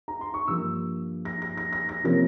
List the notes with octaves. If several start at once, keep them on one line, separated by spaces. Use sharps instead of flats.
A#5
C6
C#6
G2 F3 A#3 E6
A#6
A#6
A#6
A#6
A#6
C3 F3 A#3 C#4 A#6